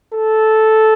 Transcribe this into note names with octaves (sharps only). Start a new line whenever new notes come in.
A4